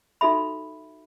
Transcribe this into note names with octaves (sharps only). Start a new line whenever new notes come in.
D#4 F#4 A4 E5 B5